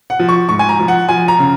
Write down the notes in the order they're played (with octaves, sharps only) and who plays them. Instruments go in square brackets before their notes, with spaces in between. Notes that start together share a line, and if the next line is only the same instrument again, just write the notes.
[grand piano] F#5
F3
C#6
G#2 C#6
G#5
A#5
F3
F#5
F3 G#5
A#5
C#3